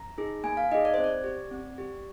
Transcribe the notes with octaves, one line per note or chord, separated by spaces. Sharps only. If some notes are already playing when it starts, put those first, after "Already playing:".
Already playing: A#5
D#4 G#4
A#3 G#5
F5
D#4 G#4 D#5
D5
C4 C5
D5
G4
C4
G4